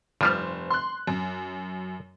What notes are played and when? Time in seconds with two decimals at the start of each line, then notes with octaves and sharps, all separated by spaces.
0.21 F1 G2 F3 G3 C5
0.70 C6 F#6
1.07 F#2